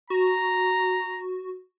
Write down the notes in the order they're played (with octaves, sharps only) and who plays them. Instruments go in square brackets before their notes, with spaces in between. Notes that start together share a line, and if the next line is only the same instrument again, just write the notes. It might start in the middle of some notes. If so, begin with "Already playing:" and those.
[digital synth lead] F#4 [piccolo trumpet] A#5